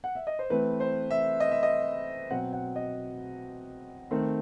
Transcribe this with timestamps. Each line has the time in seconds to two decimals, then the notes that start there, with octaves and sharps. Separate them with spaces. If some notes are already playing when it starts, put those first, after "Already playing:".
0.04 F#5
0.15 E5
0.27 D#5
0.39 C5
0.50 E3 A3 C4 B4
0.80 C5
1.11 E5
1.40 D#5
1.51 E5
1.63 D#5
2.31 B2 F#3 C4 F#5
2.53 F#5
2.76 D#5
4.11 D#3 A3 C4